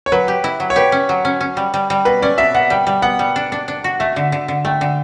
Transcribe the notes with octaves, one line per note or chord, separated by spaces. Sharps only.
C#5
F#3 B4
G4
E4
F#3
C#5
G4 B4
C#4
F#3
C#4
C#4
G3
G3
G3
B2 B4
C#4 D5
B2 E5
B2 F#5
G3 G5
G3
B3 F#5
G3
D4
D4
D4
F#4
A3 E5
D3
D3
D3
A3 G5
D3